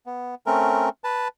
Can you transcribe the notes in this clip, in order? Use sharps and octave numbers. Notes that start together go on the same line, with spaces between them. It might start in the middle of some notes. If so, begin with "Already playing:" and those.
B3
A3 C4 C#4 A#4
B4 A5